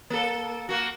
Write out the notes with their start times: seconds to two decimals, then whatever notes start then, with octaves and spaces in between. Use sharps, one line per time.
0.10 A#3 A4
0.69 A#3 F#4